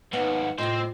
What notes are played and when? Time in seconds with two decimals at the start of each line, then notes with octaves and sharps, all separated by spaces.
0.13 D#2 G#2 B3 D#4 B4 F#5
0.58 A2 C3 C4 F4 C5 D#5 G5